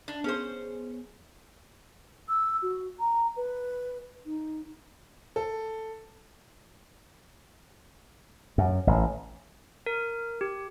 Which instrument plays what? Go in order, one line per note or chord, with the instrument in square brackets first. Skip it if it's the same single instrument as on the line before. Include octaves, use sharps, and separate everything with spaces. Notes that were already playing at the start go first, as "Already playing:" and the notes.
[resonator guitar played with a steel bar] D4
[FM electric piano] B3 G#4 [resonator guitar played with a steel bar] C#4 C5
[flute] E6
F#4
A#5
B4
D#4
[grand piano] A4
[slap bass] F#2
A1
[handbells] A#4
G4